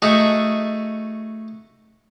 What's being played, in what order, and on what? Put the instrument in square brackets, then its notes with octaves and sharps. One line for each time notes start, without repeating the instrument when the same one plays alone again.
[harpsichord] A3 D#4 F#4 G#4